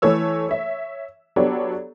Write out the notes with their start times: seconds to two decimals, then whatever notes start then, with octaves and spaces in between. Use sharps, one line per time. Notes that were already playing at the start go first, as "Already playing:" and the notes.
0.02 E3 A3 A4 C#5 E6
0.49 C#5 E5
1.36 F#3 B3 D4 G4 A4 C#5